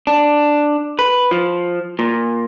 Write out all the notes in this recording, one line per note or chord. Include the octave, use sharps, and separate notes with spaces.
D4
B4
F3
A#2